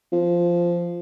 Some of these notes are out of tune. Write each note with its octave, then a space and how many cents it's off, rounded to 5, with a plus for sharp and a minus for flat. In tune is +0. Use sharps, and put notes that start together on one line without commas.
F3 -10